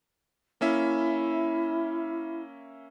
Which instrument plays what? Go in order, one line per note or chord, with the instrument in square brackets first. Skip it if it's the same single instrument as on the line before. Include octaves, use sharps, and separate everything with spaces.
[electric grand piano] A#3 C#4 E5 [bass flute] E4